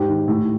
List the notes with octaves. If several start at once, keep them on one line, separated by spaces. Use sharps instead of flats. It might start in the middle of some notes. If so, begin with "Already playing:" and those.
Already playing: G#2 G4
D#3
A2